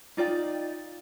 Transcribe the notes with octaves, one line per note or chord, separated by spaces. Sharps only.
D#4 F4 D5 G5